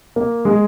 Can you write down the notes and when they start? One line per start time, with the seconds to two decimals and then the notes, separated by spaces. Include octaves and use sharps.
0.16 A#3
0.45 G#3